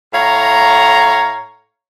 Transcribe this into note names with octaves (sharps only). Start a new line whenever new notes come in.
A2 C#5 F5 A#5